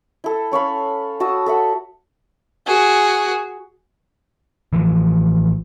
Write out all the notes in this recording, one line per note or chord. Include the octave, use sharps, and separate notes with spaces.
E4 A4
C#4 C#5 F5 B5
F#4 A5 D#6 E6
A4 E5 F#5
F#4 G#4
A1 E3 F3